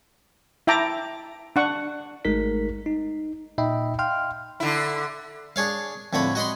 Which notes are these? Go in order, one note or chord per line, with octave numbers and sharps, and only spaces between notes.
E4 E5 G5 A5 A#5 D6
D4 F#5 C#6
G#1 G#3 A3 D#4 A#4 B6
D#4
A#2 D#4 D#5 E5 G5 B5
F5 G5 C6 F6
D3 E4
D4 G#4 C#5 F5
F2 A2 D3 C#5 B5
F#4 D#5 B5 C6